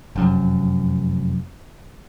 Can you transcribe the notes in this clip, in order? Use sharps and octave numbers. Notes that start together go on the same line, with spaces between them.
F1 F#2